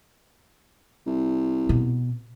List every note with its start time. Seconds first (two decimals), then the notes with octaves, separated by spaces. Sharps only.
1.06 C2
1.69 B2